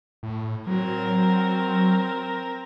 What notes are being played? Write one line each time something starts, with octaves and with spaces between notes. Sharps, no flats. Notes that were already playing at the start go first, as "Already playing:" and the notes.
A2
F#3 C4 A#4